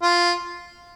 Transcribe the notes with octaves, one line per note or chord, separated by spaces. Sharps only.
F4